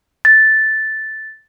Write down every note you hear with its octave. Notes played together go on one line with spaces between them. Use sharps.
A6